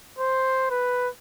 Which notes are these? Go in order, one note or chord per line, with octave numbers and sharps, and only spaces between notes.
C5
B4